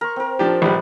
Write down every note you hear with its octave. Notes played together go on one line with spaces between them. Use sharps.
A#4 C6 C#6
C4 A#4
F3 D4 G4
A#1 G3 B4 B5